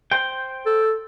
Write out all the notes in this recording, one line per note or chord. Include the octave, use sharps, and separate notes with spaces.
C5 G5
A4